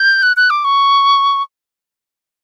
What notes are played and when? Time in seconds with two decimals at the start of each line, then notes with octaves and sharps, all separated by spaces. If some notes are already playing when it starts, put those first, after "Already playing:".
Already playing: G6
0.23 F#6
0.37 F#6
0.50 D6
0.64 C#6